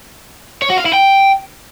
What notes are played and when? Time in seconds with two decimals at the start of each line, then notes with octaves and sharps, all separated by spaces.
0.62 C#5
0.70 F#4
0.78 F5
0.86 E4
0.93 G5